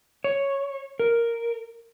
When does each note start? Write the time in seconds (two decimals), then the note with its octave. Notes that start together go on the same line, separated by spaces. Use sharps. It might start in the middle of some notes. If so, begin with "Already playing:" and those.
0.24 C#5
1.00 A#4